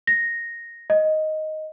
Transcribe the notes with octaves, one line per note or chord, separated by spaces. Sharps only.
A#6
D#5